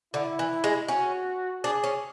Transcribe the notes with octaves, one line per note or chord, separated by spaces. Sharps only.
D3 E4
E3
G#3
C#4 F#4
D4 G#4
C#4